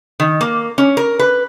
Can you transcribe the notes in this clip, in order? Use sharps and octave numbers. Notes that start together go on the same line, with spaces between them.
D#3
A#3
C#4
A#4
B4